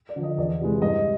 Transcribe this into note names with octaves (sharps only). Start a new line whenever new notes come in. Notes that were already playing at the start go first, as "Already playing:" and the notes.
D5
D3 F3
D#5
E2 D5
C3 E3 G#3
G2 D#5